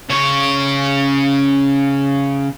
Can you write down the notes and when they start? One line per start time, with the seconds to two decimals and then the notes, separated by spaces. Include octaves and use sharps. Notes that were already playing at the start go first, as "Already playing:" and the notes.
0.10 C#3 C#5